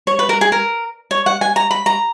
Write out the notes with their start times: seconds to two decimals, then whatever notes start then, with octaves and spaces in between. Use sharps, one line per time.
0.07 C#5
0.19 B4
0.29 A#4
0.41 G#4
0.52 A#4
1.11 C#5
1.26 F#5
1.41 G#5
1.56 A#5
1.71 B5
1.86 A#5